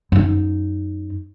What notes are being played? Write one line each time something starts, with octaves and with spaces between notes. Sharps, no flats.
F#2 D#4